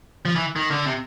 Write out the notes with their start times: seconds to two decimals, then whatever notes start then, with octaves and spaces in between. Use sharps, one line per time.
0.25 F3
0.35 E3
0.56 D#3
0.71 D3
0.86 C3